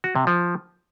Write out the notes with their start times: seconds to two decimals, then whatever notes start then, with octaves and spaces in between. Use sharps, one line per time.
0.04 F#4
0.15 C3
0.27 F3